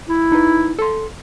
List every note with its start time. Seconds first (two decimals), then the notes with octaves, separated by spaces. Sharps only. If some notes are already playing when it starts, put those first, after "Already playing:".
0.09 E4
0.32 D#4 B4
0.79 A4 C6